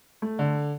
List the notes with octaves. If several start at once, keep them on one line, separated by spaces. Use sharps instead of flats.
A3
D3